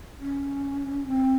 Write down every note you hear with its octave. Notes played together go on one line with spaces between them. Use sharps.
C#4
C4